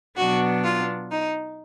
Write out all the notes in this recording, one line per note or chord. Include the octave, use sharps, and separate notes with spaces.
B2 F#3 B3 D4 F#4
F4
D#4